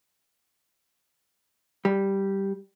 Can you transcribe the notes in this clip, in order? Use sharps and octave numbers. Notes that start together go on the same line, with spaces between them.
G3